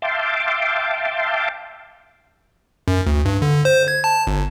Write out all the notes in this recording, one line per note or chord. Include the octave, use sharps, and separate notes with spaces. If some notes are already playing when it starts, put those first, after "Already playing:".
E5 F5 G5 A5 C6 D6
F#2
D2
G2
D3
C5
G#6
A5
G1